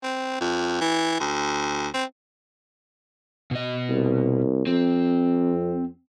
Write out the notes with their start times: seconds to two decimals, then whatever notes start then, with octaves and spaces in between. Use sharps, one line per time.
0.04 C4
0.41 F2
0.81 E3
1.20 D2
1.94 C4
3.51 B2 D#5
3.90 C2
4.67 F2 C4